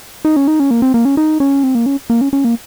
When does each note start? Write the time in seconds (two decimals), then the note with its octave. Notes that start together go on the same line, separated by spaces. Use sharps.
0.25 D#4
0.36 C#4
0.48 D#4
0.60 C#4
0.71 A#3
0.82 C4
0.94 A#3
1.05 C#4
1.17 D#4
1.40 C#4
1.63 C4
1.75 A#3
1.86 C#4
2.10 A#3
2.21 C#4
2.33 C#4
2.44 A#3